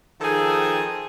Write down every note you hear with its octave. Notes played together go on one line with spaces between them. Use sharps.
D#3 F3 G#4 A4 G5